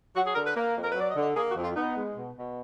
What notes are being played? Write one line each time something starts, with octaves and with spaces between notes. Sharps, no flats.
F#3 F#4
G#4
D3 A#4
B4
A#3
F2
A#4
F#3 B4
D5
D#5
D3
D#5
A#3 G#4
F#4
F2
F4
B3 D#4
G#3
B2
B2